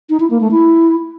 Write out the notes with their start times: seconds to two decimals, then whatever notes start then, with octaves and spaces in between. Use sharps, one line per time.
0.10 D#4
0.20 E4
0.30 A#3
0.41 A3
0.51 E4